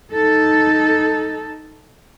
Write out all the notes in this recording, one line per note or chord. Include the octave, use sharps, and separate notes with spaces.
D#4 A4